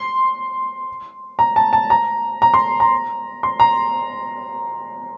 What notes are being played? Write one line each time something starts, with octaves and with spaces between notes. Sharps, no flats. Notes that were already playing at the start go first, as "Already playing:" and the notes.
Already playing: C6
A#5
A5
A5
A#5
A#5
C6
A#5
C6
A#5